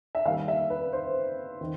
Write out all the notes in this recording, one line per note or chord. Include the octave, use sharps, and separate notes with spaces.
E5
D#3 G3 A#3 F5
E5
B4
C5
D#3